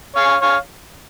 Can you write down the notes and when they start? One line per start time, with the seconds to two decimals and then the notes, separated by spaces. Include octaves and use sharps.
0.16 C#5 F5
0.42 C#5 F5